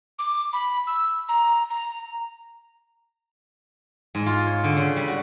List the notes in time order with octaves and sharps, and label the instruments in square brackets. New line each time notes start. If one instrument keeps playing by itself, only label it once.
[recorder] D6
B5
E6
A#5
A#5
[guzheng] G#2
F4
C#5
D3
C#3
G3
F#4